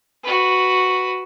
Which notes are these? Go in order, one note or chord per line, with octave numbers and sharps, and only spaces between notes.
F#4 B4